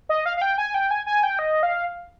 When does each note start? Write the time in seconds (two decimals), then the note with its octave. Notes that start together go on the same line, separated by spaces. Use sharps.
0.09 D#5
0.26 F5
0.37 F5
0.42 G5
0.58 G#5
0.74 G5
0.91 G#5
1.06 G#5
1.23 G5
1.39 D#5
1.63 F5